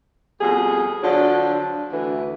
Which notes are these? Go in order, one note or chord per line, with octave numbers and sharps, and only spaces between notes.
F2 B2 G3 G#4
D3 F3 F#3 D4
D2 E3